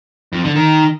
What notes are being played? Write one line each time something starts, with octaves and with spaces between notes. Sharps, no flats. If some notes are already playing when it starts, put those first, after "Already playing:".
F2
D3
D#3